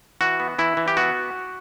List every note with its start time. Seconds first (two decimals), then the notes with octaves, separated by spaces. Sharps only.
0.21 E3 F#4
0.40 B3
0.58 E3 E4
0.77 E3
0.88 G4
0.97 B3 F#4